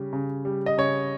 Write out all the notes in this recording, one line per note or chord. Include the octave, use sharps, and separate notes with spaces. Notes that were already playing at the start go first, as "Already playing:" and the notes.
Already playing: C#3 G3
C#3
G3
D#5
C#3 C#5